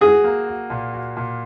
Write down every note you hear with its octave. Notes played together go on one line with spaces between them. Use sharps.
F#4 G#4
A#3
F#4
A#2
F#4
A#2